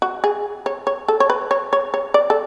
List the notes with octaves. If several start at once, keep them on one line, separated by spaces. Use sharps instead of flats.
F#4
G#4
C#5
C#5
A4
C#5
B4
C#5
C#5
C#5
D5
A4